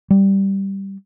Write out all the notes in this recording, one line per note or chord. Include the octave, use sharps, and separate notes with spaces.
G3